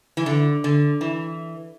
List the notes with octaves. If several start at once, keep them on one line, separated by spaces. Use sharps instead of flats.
E3
D3
D3
E3